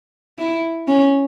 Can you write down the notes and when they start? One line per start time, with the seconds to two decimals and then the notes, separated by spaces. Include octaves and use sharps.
0.38 E4
0.87 C#4